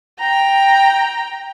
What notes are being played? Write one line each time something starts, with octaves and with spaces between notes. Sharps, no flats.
G5 A#5